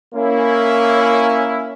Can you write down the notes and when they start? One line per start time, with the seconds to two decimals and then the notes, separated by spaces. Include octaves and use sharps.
0.14 A#3 C#4 E4